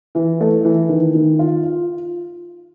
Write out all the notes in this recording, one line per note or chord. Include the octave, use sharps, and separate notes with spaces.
E3
A3
E3
D#3
D#3
F4
F4